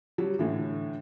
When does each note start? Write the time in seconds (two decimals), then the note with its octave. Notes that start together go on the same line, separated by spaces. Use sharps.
0.18 F#3 G3
0.39 A2 D3 E3